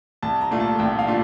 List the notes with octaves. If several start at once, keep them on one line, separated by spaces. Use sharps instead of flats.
C2 A5
A#5
A#2 A3 D4 F4
A5
C2 G5
F5
A#2 A3 D4 F4